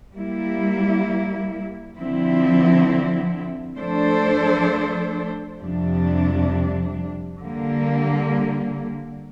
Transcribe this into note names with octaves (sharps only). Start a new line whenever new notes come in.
G3 A#3 E4
D3 F3 C4 E4
F3 A3 D4 A4 C5
F2 C3 G3 D4
D3 G3 A#3